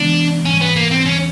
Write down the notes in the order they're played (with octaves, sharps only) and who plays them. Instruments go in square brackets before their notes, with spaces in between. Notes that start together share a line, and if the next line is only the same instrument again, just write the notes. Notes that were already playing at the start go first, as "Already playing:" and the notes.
Already playing: [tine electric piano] C#3 E3 G#3 B3 [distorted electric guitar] D4
[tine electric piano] G#2 E3 G3 [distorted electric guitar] C#4
[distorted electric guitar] B3
A#3
C4
[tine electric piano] D#2 C#3 E3 G#3 C4 [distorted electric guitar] C#4